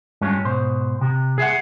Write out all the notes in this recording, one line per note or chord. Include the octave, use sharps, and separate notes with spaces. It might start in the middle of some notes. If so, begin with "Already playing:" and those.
G2 G#3 C#4 F4
G#2 B2 C5
C3
G#4 E5 F#5